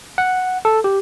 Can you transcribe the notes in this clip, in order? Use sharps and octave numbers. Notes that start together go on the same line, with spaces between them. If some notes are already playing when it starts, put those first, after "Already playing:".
F#5
A4
G4